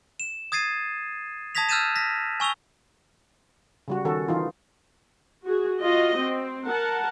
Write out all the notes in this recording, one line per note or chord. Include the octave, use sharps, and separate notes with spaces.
E7
D#6 G#6 A6 C7 D#7
A5 D#6 G#6 A#6 B6 F7
E6 F6 G6 A6 D#7 E7
A#6 B6
G#5 C#6 E6 F7 G7
C#3 G3 F#4
D#3 C#4 F#4 A4
E3 D#4 F4
F#4 G#4
F4 F#4 D#5
C4
A#4 F#5 A5